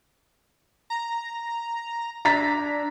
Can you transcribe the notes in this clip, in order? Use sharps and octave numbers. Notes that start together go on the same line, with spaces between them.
A#5
D4 A#5 A6 B6